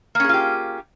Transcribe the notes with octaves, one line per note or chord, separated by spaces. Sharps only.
A#3 C#4 F4 G4 G#4